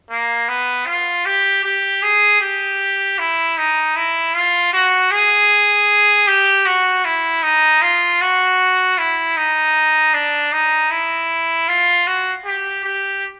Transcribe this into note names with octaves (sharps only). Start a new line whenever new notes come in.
A#3
B3
F4
G4
G4
G#4
G4
E4
D#4
E4
F4
F#4
G#4
G4
F#4
E4
D#4
F4
F#4
E4
D#4
D4
D#4
E4
F4
F#4
G4
G4